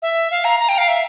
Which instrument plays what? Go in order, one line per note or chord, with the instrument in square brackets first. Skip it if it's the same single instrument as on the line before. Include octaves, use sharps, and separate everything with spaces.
[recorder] E5
F5
A#5
A#5
G5
F5
E5